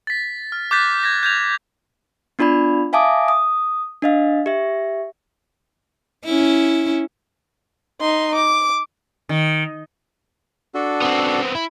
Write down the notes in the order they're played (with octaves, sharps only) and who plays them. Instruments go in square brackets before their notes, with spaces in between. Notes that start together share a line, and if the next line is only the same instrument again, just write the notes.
[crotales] A6 B6
F6
D6 F#6 G6 A6 B6
G#6 A#6
G6 G#6 F7
[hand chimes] B3 D4 F4 D5 B5
E5 F5 G#5 A5 D6 D#6
D#6
D4 D#5 F5
G4 E5
[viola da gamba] C#4 E4
[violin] D#4 C6
D6
[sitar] D#3
[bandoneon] D4 F#4 A4
[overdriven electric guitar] B3 C4
E4